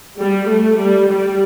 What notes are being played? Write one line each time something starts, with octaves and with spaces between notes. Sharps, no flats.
G3
A3
G3
G3